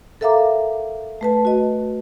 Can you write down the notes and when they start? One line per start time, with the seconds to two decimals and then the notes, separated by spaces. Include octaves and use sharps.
0.21 A4 A#4 E5 F5 A#5 D6
1.21 A3 B4 A5
1.45 F#4 D#5